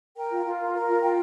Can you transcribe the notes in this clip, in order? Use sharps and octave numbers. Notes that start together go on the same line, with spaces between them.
A#4 G5
F4
F4
A#4
A#4
F4
F4 G5